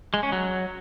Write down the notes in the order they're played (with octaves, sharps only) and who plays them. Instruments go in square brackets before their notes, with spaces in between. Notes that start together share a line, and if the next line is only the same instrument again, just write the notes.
[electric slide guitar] G#3
C#4
F#3